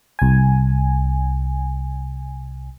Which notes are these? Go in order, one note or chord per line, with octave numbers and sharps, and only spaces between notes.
C2 G#5